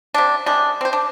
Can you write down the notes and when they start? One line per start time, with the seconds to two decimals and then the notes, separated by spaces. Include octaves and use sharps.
0.14 C3 D4
0.46 C3 G#3 D4
0.81 C4 C5
0.93 D4